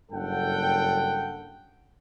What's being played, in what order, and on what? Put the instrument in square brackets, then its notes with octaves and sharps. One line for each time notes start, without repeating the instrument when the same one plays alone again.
[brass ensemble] F#1 G2 A4 F#5 G5